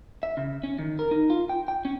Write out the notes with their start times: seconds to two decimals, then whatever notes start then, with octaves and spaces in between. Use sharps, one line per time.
0.23 E5
0.37 C#3
0.63 C#4
0.79 D#3
0.99 A#4
1.11 D#4
1.30 F4
1.49 G5
1.68 G5
1.85 C#4